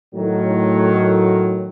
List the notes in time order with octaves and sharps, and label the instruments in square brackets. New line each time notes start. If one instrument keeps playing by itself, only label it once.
[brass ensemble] A2 D#3 F#3